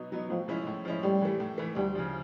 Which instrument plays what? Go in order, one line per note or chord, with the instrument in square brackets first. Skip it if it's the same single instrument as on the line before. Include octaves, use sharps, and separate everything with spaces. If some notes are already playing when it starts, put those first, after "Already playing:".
Already playing: [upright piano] B2 F#3 B3 D#4
F#3 B3 D#4
[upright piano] A2 [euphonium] F3
[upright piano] F3 G#3 C#4 E4
A2
F3 G#3 C#4 E4
[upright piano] A2 [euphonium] G3
[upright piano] E3 A3
A2
E3 A3
[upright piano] D2 [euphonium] G3
[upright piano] C#3 F3